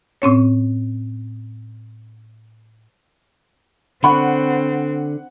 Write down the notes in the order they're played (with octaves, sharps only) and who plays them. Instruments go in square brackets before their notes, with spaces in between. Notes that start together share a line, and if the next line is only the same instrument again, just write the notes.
[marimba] A2 C4 C#4 C#5
[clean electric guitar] D3 [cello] C4 [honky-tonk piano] F#5 [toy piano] B5 C#6